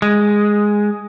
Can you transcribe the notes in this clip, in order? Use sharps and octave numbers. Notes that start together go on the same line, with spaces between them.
G#3